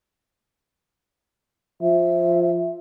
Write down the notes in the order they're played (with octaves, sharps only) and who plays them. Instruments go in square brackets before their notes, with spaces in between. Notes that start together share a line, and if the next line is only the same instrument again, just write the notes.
[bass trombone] F3 [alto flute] E5